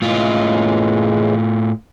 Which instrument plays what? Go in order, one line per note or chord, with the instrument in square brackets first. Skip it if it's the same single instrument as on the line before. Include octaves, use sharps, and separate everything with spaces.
[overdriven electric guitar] A2 F4 [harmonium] C#3 E3 G#3